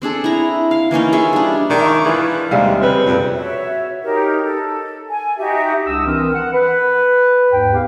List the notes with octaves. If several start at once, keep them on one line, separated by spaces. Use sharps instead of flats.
C4 D4 G#4 A4
E4 A#5
F5
E3 A#3 C#4 D#4
F4 G#4 C#5 E5
G3 D4
D#3 D4 G#4
E5 C#6
E3 F4 G#4
D#2 C3 G3 G#3 E5 F5
C#3 C4 B4
F2 A#2
F#4 C#5 E5
D#4 G4 A#4 C#5
A4
G#5
D#4 F#4 G4 E5
C2 D4 D#6 E6
E3 C4 A#4
F#5
B4
D#2 G#2 G5
B3 G4 G#4 F5 G5